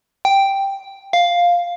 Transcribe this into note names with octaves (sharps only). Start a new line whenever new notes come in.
G5
F5